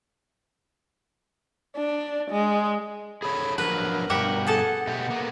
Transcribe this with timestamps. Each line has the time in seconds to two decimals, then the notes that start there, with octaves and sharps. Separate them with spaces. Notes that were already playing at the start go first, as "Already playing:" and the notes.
1.76 D4
2.31 G#3
3.23 G#4 A4 C#5 B5
3.58 F3 F#3 D4 A#4 B4
4.10 G2 B2 G4 E5 F#5
4.47 G#4 A4 F#5 A5
4.87 B2 A3 G4 F#5
5.10 A#3 B3